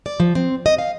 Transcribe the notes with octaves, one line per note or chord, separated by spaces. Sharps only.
D5
F3
C4
D#5
F5